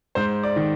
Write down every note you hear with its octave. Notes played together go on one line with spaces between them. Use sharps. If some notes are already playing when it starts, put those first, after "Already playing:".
G#2 C5
D5
D#3